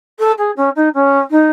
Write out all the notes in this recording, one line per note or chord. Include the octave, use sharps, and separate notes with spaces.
A4
G#4
C#4
D#4
C#4
D#4